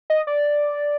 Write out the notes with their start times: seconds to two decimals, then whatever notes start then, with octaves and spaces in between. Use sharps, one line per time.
0.10 D#5
0.27 D5